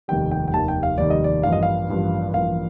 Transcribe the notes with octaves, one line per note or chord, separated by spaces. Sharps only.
F1 D#2 D#3 G3 G5
G5
G5
F1 D#2 D#3 G3 A5
G5
F5
F1 D#2 D#3 G3 D5
D#5
D5
A1 G2 F3 A#3 F5
D#5
F5
A1 G2 F3 A#3
A1 G2 F3 A#3 F5